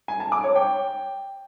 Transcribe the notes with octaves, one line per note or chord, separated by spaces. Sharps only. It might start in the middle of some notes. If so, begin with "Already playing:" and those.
G#5
A5
D6
C#5
G5